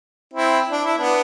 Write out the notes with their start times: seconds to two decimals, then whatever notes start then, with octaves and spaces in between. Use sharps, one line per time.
0.33 C4 E4
0.71 D4
0.84 E4
0.98 B3 D4